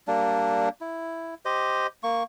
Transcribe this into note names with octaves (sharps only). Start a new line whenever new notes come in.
G3 A#3 D4
E4
G4 C5 D#5
A#3 C#6